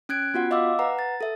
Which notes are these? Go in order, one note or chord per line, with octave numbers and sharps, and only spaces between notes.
C#4 F#6 G#6 D7
B3 F4 F#4 F#5
D#5 F5 D6 E6
B4 F#5 A#5
A6
A4 E5